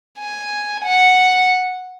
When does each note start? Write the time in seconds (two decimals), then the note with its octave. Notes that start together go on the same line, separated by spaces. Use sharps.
0.19 G#5
0.84 F#5